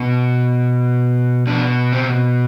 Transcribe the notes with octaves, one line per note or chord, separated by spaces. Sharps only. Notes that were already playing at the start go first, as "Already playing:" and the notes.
Already playing: B2
B2 D4
C4